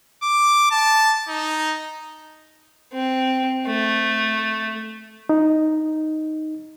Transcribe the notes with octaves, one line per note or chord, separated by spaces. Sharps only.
D6
A5
D#4
C4
A3
D#4